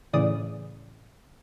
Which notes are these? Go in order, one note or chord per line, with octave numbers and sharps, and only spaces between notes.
A2 C#3 E3 D5 D#6